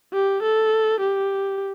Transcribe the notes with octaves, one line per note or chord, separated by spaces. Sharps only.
G4
A4
G4